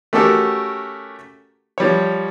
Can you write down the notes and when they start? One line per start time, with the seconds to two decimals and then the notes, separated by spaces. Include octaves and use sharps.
0.13 A3 C#4 F#4 G4 A4 A#4
1.78 F3 G3 C#5